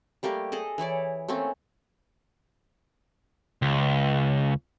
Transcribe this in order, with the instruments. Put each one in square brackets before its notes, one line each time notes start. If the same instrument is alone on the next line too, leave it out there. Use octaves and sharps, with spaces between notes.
[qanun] G3 A3 A#3 G4
G#4 A4 D#5
E3 E4 C#5 D5
A3 A#3 C4 C#4
[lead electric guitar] C#2